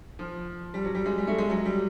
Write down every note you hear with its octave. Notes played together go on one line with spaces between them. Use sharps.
F3
G3
F#3
G3
G#3
G3
A3
G#3
F#3
G3